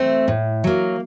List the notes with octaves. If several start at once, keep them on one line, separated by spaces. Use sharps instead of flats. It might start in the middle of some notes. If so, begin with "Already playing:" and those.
Already playing: A3 C4
A2
F#3 A#3